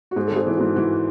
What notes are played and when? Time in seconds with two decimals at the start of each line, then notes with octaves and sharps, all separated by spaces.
0.11 F#4
0.16 G#2 G#4
0.27 A4
0.31 G#1 G#4
0.47 E3
0.57 G#2 F#4
0.76 E3 F#4